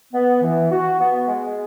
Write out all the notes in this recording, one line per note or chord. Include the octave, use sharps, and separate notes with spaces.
B3
E3
F#4
B3
G#3